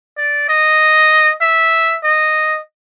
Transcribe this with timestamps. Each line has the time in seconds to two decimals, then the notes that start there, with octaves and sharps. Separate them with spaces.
0.18 D5
0.49 D#5
1.41 E5
2.03 D#5